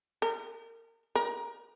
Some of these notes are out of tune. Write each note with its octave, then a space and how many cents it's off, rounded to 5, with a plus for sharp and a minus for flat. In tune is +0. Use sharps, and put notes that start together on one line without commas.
A#4 -25
A#4 +15